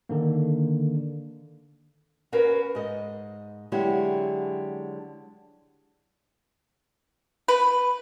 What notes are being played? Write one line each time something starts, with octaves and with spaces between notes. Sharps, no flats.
D3 D#3 A#3
C#4 F#4 A#4 B4 F5
G#2 D#5
D3 F#3 G#3 E4 F#4 G4
B4